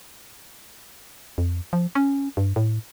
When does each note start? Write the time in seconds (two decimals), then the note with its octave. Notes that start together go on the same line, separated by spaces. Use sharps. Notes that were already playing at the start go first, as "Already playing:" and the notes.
1.38 F2
1.73 F3
1.95 C#4
2.37 G2
2.56 A2